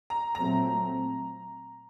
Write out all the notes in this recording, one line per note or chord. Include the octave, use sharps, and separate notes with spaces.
A#5
A#2 F#3 A3 C4 A#5